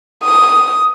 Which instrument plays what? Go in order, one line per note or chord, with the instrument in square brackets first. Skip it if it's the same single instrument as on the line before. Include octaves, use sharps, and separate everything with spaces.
[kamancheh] D#6